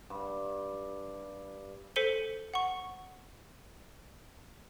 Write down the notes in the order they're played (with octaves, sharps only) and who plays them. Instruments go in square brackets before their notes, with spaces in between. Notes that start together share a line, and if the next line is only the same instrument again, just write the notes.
[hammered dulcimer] G2 D4
[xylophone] A4 C5 B6 C#7 D#7 G7
F#5 C#6